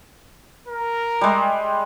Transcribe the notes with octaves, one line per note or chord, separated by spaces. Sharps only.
A#4
G3 G#3